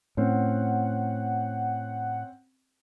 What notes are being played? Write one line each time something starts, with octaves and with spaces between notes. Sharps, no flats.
A2 C4 C#4 F#5